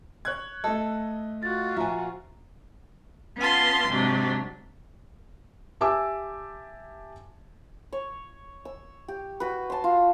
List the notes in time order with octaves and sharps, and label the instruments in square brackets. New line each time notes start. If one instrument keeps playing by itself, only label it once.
[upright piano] C#5 F#6 G#6
[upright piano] A3 D#5 [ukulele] A4
[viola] F4 F#4 [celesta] F#6 A6
[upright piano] A#2 F3 [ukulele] E5 G#5 [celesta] F#5 A#5
[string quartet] B3 C#4 F4 A5 C6
G#2 C3 F#3 D4
[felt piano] G4 E5 G#5 A5 D6 E6
[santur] C#5
E6
G4
F#4 B4
A5 C6
F4